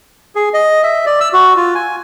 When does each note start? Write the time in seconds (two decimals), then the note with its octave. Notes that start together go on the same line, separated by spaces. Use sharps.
0.35 G#4
0.54 D#5
0.83 E5
1.06 D5
1.20 E6
1.33 F#4
1.56 F4
1.75 G#5